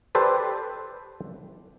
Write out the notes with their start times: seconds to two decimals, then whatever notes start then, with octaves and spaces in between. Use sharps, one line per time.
0.15 G4 A4 B4 C5 D5